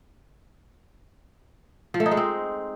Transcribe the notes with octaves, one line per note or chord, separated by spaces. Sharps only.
F3
A3
D#4
G#3
C4